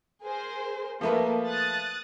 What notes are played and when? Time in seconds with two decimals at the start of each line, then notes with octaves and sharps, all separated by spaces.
0.23 G#4 A#4 C5
1.01 F3 A3 A#3 B4
1.44 D#6 F#6 A6